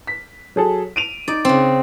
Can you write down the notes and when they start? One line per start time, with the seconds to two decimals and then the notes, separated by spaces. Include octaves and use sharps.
0.07 B6
0.56 F#3 G#4 A4
0.96 D7 D#7 F7
1.28 D#4 D5
1.45 C#3 C4